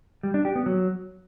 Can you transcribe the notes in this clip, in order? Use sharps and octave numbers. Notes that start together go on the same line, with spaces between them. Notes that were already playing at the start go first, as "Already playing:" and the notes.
G3
D4
G4
B3
F#3